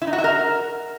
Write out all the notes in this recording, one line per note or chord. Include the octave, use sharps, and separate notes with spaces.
E4
D#4
F#4
E5
A#4